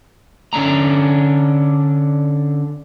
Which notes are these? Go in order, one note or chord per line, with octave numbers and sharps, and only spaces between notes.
D3 C#4 D4 A#5